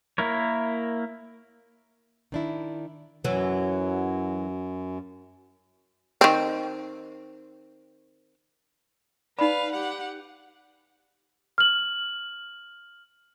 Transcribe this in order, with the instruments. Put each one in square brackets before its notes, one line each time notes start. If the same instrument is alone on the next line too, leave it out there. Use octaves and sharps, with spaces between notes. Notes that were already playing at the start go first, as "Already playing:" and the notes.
[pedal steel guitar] A#3 E4 A#4 C#5
[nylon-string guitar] D#3 D4 E4
[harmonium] F#2 [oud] E3 F#3
[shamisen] D#3 C4
[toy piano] D#4 B5 [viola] B4 F5 [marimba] D5
[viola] G4 F#5
[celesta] F6 F#7